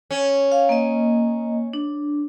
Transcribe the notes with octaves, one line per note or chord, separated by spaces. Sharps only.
C#4
F5
A#3 D#5
D4